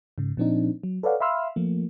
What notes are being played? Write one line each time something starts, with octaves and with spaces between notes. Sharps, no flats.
G#2 C#3
A#2 F3 C4 D4 D#4
F#3
A4 B4 C#5 D5 F5 F#5
E5 F5 B5 C6 E6 F6
F3 A3 A#3